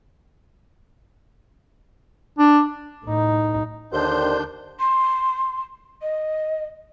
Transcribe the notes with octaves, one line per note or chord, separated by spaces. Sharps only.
D4
A2 D#4
D#2 D3 D#3 D4 C5 G6
C6
D#5